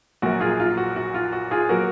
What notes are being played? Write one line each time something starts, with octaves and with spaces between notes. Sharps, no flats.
A#1 A#2 F#3 A#3 F#4
F4 G#4
F4
F#4
F#4
F4
F#4
F4 G#4
F#3 A#3 F#4 A#4